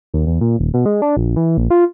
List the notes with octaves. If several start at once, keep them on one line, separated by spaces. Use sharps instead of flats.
D#2
E2
A#2
D#1
B2
G#3
D4
A#1
E3
A#1
F4